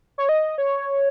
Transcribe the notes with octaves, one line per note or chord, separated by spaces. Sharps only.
C#5
D#5
C#5